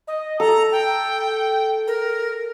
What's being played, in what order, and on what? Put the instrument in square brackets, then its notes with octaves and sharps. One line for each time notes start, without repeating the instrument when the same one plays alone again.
[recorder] D#5
[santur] A4 [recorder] A#5
[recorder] G5
A#4